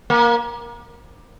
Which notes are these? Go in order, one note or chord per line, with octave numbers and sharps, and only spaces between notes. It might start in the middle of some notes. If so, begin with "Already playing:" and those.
A#3